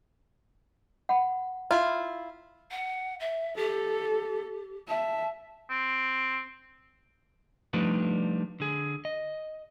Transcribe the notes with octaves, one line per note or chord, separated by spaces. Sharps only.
F#5 B5
E4 F4
F#5
E5
G4 A4
E5 A5
C4
F3 G3 A3 D4 D#4 B4
D3 G#4
D#5